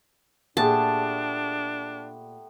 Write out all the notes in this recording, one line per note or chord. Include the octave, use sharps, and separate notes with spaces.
A#2 A3 B3 D4 G4 G#4 A5